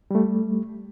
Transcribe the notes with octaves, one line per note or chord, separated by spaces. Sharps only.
G3 A3